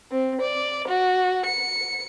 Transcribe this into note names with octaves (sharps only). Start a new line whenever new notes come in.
C4
D5
F#4
C#7